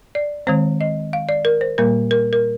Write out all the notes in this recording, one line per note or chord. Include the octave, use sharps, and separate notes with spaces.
D5
D#3 G#3 C4 C5
D#5
F5
D5
A#4
C5
A#2 G3 A#3 A#4
A#4
A#4